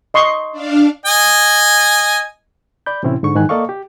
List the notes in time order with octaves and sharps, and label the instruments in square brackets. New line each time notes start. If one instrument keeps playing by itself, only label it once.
[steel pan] D#5 C6 C#6
[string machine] D4 F5
[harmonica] D#5 G#5
[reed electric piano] D5 B5 G6
A2 C3 E3 C4 C#4 E4
G#2 D3 C#6
G#2 D#3 E3 G#5 F#6
A#3 A4 D5 D#5 F5 C#6
G4